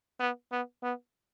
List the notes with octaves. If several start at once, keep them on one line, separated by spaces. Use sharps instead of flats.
B3
B3
B3